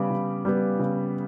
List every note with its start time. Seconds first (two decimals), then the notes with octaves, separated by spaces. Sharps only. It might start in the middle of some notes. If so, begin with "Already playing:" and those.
Already playing: C#3 G3 B3 B5 D6
0.10 C#3
0.45 G3 B3
0.79 C#3